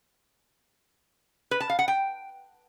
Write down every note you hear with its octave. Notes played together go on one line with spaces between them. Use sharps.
B4
A5
F5
F#5
G5